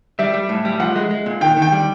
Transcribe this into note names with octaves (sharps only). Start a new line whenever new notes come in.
G3 E5
G3
A2
G3
F3 F#5
G#3
G#3
A#2
D#3 G5
D#3
G5
G3